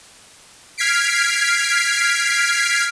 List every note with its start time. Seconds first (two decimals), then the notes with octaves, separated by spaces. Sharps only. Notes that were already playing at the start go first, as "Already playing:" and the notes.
0.77 F6 G#6 B6 C7 D7